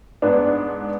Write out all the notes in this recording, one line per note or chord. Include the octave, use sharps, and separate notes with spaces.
G#2 B3 D4